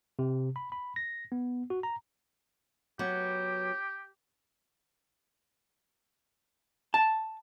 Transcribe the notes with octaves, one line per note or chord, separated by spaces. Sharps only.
C3
B5
B5
A#6
B3
F#4
A#5
F#3 B3 G4
A5